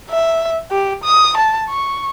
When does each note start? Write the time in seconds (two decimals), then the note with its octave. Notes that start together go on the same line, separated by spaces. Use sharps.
0.10 E5
0.72 G4
1.04 D#6
1.37 A5
1.69 C#6